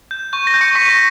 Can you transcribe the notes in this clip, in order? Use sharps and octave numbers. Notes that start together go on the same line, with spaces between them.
G6
C#6 G6
A#6
G6
C#6 C#7
C#6 B6
A#6